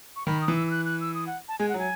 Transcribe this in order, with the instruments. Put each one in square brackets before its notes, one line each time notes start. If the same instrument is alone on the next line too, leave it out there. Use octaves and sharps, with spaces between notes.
[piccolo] C#6
[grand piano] D#3 [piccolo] B5
[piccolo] D#6
[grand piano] E3
[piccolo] E6
E6
F#6
F#6
E6
D#6
F#5
A5
[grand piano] G#3 [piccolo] G#5
[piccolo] F#5
[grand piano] F#3 [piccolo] G#5